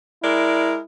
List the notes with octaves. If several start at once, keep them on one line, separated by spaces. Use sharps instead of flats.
G#3 E4 A#4 D5